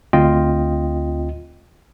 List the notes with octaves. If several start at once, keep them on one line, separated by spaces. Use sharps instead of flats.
D2 C4 F4 D#5 G5